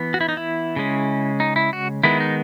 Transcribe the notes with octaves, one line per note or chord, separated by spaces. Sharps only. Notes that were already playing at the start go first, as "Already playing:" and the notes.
Already playing: E3 B3
F#4
E4
D#4
E4
C#3 G#3 C#4
D#4
E4
F#4
D#3 G#3 B3 E4
D#4